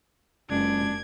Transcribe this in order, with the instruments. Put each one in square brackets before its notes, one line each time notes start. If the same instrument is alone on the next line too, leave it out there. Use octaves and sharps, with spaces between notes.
[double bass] F#1 [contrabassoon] C#2 [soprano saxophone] D4 [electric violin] G#6